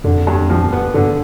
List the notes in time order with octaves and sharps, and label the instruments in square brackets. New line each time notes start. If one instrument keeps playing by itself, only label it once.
[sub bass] F2 [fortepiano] D3
[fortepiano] G2
F3
B3
[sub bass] G2 [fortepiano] D3